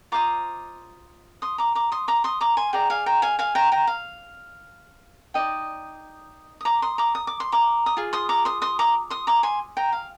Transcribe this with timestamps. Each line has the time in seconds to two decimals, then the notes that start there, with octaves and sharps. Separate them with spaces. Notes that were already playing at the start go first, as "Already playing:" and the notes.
0.12 F4 C5 D#5 A#5 D6
1.42 C6 D#6
1.58 A#5 D6
1.75 A#5 D6
1.92 C6 D#6
2.08 A#5 D6
2.24 C6 D#6
2.41 A#5 D6
2.57 G#5 C6
2.73 G#4 D5 G5 A#5
2.90 F5 G#5
3.06 G5 A#5
3.22 F5 G#5
3.39 F5 G#5
3.55 G5 A#5
3.72 G5 A#5
3.87 F5
5.34 D#4 G4 D5 D#5 G5
6.61 D#6
6.65 A#5 D6
6.82 C6 D#6
6.98 A#5 D6
7.15 D#6
7.27 D6
7.40 C6
7.52 A#5 D6
7.86 D#6
7.97 F4 G#4
8.13 C6 D#6
8.29 A#5 D6
8.45 C6 D#6
8.62 C6 D#6
8.79 A#5 D6
9.10 C6 D#6
9.27 A#5 D6
9.43 G#5 C6
9.77 G5 A#5
9.92 F5